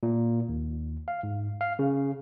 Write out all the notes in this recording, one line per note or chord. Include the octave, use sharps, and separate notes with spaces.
A#2
D#2
F5
G#2
F5
C#3